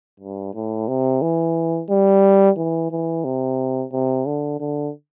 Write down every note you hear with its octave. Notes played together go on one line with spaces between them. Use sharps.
G2
A2
C3
E3
G3
E3
E3
C3
C3
D3
D3